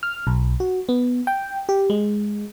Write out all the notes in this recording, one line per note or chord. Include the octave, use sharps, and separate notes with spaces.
F6
B1
F#4
B3
G5
G4
G#3